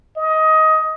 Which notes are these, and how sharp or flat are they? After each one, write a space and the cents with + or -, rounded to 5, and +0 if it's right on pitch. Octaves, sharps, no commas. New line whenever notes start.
D#5 +20